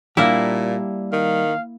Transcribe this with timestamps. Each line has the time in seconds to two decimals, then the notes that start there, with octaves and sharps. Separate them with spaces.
0.17 A#2 G3 A#3 D4 E4 G4
1.12 D#3 F5